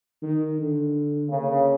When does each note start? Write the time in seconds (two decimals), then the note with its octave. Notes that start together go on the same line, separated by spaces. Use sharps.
0.22 D#3
0.59 D3
1.28 C#3 A#3